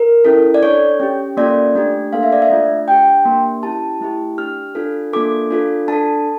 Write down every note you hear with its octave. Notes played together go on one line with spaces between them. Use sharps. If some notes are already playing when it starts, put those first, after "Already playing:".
Already playing: A#4
C#4 E4 A4
D5
D4 A4 C#5
C#4 G4
A#3 C#4 F4 A4 D5
A3 D4 G4
A#3 D4 A4 F5
E5
D5
E5
A3 D4 F4
D4 G4 G5
A#3 D4 G4
C#4 E4 G4 A5
A3 E4 G4
D4 G4 F6
D4 F4 A4
A#3 D4 F4 A4 D6
D4 F4 A4
D4 A4 A5